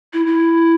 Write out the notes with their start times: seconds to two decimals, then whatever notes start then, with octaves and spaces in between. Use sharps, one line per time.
0.13 E4
0.27 E4